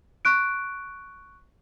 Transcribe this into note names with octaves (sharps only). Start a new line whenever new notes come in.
C#6 F#6 D7